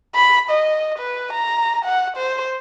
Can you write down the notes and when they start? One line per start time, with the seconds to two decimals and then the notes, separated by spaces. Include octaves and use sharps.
0.15 B5
0.50 D#5
0.99 B4
1.33 A#5
1.85 F#5
2.17 C5